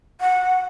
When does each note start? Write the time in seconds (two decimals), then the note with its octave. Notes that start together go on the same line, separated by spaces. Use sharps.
0.21 F#5